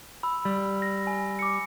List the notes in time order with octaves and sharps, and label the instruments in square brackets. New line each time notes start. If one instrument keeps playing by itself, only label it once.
[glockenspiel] B5 E6
[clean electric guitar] G3
[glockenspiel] A#6
G#5
D6 C#7